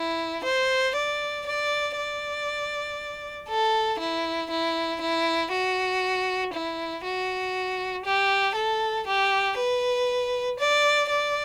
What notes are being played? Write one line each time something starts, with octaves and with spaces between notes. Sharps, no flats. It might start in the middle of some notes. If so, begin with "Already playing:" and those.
Already playing: E4
C5
D5
D5
D5
A4
E4
E4
E4
F#4
E4
F#4
G4
A4
G4
B4
D5
D5